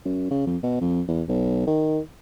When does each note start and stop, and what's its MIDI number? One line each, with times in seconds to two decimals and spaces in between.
0.05 0.29 42
0.31 0.46 49
0.46 0.57 41
0.63 0.76 47
0.81 1.01 41
1.08 1.22 40
1.28 1.66 35
1.67 1.99 51